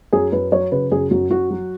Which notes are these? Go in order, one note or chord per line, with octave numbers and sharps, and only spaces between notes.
F#2 G#4
F#2 B4
F#3 C#5
C#3 B4
F#2 G#4
F#2 F#4
F#2 F#4
F#3